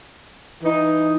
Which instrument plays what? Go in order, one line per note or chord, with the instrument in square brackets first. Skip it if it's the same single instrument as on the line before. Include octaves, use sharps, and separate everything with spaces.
[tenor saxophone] E3 [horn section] D#4